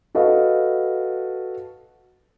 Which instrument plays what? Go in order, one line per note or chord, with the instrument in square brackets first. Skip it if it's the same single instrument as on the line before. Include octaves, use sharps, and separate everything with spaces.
[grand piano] F#4 A4 B4 D#5 F5